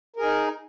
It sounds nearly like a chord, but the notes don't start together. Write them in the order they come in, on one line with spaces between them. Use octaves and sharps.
A#4 G#4 D#4